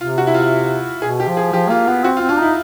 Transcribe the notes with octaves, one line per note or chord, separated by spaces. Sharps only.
C3 F4
F#4
E4
F4
B2 G#4
G4
F3
G#4
F3 G4
A#3 F4
B3 F4
C4 F#4
F4
C4
D4 F4
D#4 E4